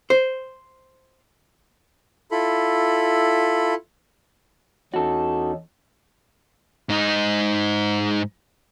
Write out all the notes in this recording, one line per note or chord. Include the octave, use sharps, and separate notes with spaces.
C5
E4 F4 A4 B5
E2 C#4 D#4 F#4 A4
G#2 D#4